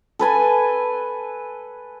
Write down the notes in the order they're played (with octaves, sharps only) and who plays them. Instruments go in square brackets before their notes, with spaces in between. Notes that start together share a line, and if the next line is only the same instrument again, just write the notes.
[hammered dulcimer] A4 B4 G#5 A5